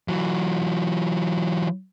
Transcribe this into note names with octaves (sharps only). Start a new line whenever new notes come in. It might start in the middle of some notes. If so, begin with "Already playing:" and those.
E3 F#3